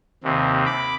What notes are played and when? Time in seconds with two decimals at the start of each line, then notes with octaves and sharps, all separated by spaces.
0.23 D#2 C3
0.66 B5 D6